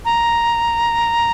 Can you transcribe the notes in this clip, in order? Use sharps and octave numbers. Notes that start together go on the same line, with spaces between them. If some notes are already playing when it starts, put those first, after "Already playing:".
A#5